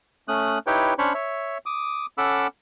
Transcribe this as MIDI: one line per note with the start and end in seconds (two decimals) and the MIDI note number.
0.28 0.59 57
0.28 0.59 61
0.28 0.59 87
0.28 0.59 90
0.67 0.94 63
0.67 0.94 64
0.67 0.94 67
0.67 0.94 71
0.67 0.94 73
0.67 0.94 79
0.99 1.13 61
0.99 1.13 62
0.99 1.13 72
0.99 1.13 73
0.99 1.13 83
0.99 1.13 85
1.14 1.58 73
1.14 1.58 76
1.66 2.06 86
1.66 2.06 87
2.18 2.47 61
2.18 2.47 69
2.18 2.47 78
2.18 2.47 83
2.18 2.47 86
2.18 2.47 88